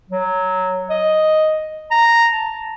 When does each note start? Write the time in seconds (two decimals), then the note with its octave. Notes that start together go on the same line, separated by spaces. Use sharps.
0.10 F#3
0.90 D#5
1.91 A#5
2.32 A5